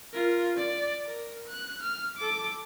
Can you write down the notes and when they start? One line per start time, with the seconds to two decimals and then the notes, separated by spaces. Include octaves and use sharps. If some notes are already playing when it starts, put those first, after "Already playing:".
0.13 F4 A#4
0.57 D5
1.06 A#4
1.48 F#6
1.83 F6
2.17 A4 D6